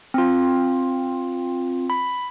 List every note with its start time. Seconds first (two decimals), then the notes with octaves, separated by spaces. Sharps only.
0.14 C4 F4
1.90 B5